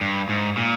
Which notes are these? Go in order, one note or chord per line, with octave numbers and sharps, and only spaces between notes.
G2
G#2
A#2